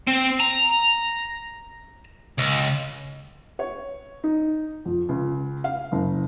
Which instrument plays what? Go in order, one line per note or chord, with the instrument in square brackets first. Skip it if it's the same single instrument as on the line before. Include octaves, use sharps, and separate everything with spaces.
[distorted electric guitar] C4
A#5
C#2
[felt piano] C#5
D#4
F2
C#2
F5
F#1